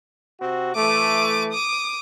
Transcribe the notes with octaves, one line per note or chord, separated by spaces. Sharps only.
C3 C4 F#4
E3 A3 D6 D#7
D6 D#6